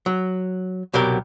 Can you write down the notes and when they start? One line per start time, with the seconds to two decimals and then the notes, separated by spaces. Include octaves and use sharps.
0.06 F#3
0.93 C2 B2 F#3 G4 A#4